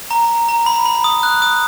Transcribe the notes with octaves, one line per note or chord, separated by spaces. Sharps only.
A#5
A#5
B5
B5
D#6
F#6
D#6